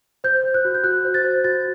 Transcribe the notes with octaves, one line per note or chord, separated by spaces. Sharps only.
C5 G6
C5
F#6
F#4
G6
F#4 F#6
C5
A6
C5
F#4 A6